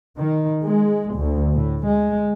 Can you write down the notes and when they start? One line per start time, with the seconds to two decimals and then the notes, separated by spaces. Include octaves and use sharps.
0.18 D#3
0.63 G#3
1.16 D2
1.54 A2
1.87 G#3